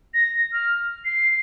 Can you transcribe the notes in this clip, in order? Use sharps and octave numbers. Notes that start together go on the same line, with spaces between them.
A#6
F6
C7